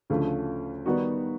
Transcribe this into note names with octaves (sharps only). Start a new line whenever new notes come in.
D2 C#3 F3 A3
D#3 G3 B3 D#4 F#4